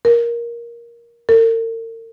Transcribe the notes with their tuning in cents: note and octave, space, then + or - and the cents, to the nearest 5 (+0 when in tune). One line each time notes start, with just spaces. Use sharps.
A#4 +10
A#4 -45